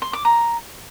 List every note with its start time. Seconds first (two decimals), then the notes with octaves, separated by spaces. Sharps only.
0.02 C6
0.13 D6
0.25 A#5